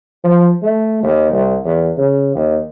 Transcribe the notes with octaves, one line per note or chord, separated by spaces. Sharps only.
F3
A3
D#2
C2
E2
C#3
D#2